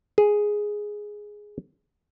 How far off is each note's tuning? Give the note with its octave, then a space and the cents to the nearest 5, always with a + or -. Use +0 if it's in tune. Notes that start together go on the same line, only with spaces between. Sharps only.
G#4 +0